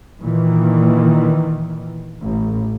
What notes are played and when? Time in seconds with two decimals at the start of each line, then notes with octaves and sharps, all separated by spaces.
0.21 A#2 D#3 E3
2.22 A1